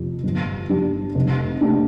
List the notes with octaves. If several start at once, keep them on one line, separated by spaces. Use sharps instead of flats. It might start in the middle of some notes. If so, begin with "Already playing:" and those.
Already playing: F2 C3 F3
G1
G2 G3 D4
F1
C3 A3 D4